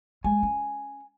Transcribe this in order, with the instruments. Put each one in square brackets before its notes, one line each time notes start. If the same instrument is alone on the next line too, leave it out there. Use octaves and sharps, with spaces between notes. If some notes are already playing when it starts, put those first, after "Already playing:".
[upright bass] G#3 A#3 [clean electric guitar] G#5
[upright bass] C#4